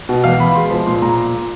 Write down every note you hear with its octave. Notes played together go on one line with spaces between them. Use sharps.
B2
E2 F5
E2 B5
G#3 C6
F3
A#2 C6
A#2 A#5